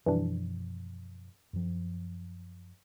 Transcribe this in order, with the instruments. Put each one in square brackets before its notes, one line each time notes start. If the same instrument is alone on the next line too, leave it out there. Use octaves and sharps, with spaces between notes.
[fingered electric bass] F#2 B2 F3 [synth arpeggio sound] E3 G3 D4
[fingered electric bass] F#2 F3